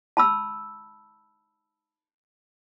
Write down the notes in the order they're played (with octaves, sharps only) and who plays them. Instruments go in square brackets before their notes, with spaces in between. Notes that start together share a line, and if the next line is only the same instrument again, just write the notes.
[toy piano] A5 B5 E6